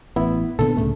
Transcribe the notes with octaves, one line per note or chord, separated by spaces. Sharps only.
A1 B3 E4
A#2 D3 B3 A4
C#2 A2 C#3 A3